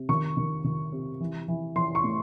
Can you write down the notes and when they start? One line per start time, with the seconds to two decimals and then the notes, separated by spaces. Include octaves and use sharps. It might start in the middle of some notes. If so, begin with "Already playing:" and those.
Already playing: C3
0.09 D#3 C#6
0.37 D#3
0.64 D#3
0.92 C3
1.20 E3
1.48 E3
1.76 E3 C6
1.95 C#6
2.04 A2